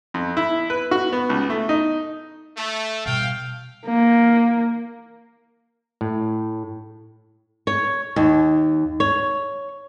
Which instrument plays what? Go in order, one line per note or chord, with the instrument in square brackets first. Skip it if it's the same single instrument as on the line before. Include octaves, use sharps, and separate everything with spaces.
[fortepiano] F2
E4
B4
F#4
B3
C#2
A3
D#4
[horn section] A3
[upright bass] B2 G3 [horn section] F5 G5
[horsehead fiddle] A#3
[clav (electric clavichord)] A2
[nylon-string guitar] C#5
D#2
C#5